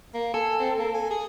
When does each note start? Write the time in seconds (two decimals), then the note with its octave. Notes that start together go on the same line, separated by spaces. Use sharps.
0.14 A#3
0.34 A4 G#5
0.60 C4
0.79 A#3
0.94 G#5
1.11 G#4